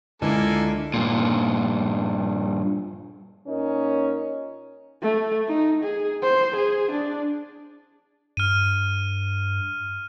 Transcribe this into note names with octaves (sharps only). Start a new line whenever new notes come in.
C#2 D3 A#3 E4 A4 G#5
G2 A#2
A#2 C#4 D#4 A#4
A3
D#4
G#4
C5
G#4
D4
G2 F6 D#7